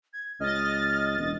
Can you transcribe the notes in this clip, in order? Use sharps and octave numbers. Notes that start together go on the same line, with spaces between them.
G#6
C#2 D#5 F6 A6
E1